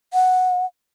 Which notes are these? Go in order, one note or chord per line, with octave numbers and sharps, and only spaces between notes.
F#5